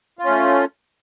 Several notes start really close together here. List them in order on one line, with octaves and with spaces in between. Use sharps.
F4 C#4 A3